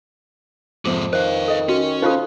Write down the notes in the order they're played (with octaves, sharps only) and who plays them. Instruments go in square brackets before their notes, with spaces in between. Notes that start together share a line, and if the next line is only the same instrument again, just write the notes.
[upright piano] F2 F3 [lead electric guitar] G#2 C3 [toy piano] D6
[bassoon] D#3 [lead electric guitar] B4 F5 [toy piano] C5
[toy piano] A4 D#5
[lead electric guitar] C#4 [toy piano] F#4
[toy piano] D#4 F4 A4 [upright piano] C5 F5 F#6